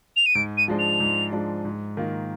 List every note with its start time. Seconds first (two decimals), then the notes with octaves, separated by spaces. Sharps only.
0.16 F7
0.26 D#7
0.35 G#2 D7
0.57 D#7
0.68 F3 G#3 D4
0.79 F7
1.00 G#2
1.32 F3 G#3 D4
1.65 G#2
1.97 D#3 A#3 F4